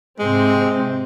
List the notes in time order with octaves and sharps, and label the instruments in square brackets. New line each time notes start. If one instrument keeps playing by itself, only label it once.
[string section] G#2 C3 C4 [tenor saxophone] G#3